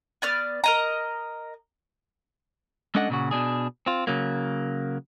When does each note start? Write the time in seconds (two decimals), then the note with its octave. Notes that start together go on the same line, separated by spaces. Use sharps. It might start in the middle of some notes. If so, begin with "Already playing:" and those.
0.22 B3 D5 F6
0.64 A#4 D#5 A#5
2.95 G#3 C#4 D4 A4 D#5 F#5
3.10 A#2 C#3 F#4
3.31 B2 D4 G#4
3.86 C4 F4
4.07 C#3 F#3 A#3